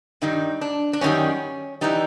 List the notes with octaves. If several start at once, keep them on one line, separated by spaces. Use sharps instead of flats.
G2 D#3 G3 D#4
D4
D4
F#2 D#3 G3 C#4
E3 G3 D#4